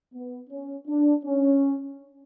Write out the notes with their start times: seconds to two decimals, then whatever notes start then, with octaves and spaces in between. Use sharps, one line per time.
0.13 B3
0.50 C#4
0.87 D4
1.24 C#4